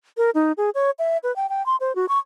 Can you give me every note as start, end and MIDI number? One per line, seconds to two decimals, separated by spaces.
0.17 0.30 70
0.35 0.52 63
0.57 0.70 68
0.75 0.91 73
0.99 1.18 76
1.23 1.34 71
1.36 1.49 79
1.49 1.65 79
1.66 1.76 84
1.80 1.95 72
1.95 2.06 66
2.09 2.18 85